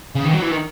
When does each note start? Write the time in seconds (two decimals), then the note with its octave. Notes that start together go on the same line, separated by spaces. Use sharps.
0.15 C#3
0.25 D#3
0.33 F#3
0.42 E3
0.51 D#3